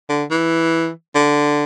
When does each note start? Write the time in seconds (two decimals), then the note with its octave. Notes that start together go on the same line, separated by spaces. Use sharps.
0.09 D3
0.31 E3
1.15 D3